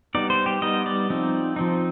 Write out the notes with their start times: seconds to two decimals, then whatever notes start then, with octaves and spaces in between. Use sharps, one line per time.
0.15 G3 B3 D#4 D5
0.30 C5
0.46 G4
0.62 G3 B3 D#4 D#5
0.86 D5
1.10 F3 C4 D#4
1.56 F3 C4 D#4